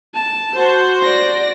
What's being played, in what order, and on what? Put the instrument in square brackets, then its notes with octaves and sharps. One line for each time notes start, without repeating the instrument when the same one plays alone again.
[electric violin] A5
[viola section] F#4 C5
[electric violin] D5 A#6